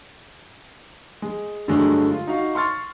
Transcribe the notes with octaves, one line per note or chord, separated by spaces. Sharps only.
G#3
G2 D3 F#3 G#3 A3
F4
D#4 F#4 F5
C6 C#6 F6 A6